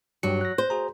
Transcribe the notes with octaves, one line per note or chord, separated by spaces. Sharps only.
G2 F#3 G4 C#7
F#6 A#6
C5
F#4 G#4 A#5